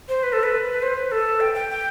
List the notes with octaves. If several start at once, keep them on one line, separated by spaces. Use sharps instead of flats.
C5
B4
A4
B4
C5
B4
A4
G5
G5
G5